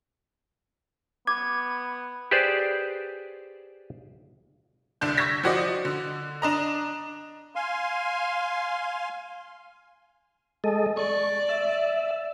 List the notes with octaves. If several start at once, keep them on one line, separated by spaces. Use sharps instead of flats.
B3 D6 G#6
G4 G#4 B4 C5 D5
C2 D3 D4 G6
C#6 E6 G6 G#6 A#6 B6
F3 F#4 D5 D#5
D3
D4 D#5 A#5
F5 G#5 C6
G#3 A4 D#5
D5 C#6
E5